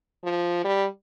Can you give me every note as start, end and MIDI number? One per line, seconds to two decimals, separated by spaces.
0.24 0.60 53
0.64 0.86 55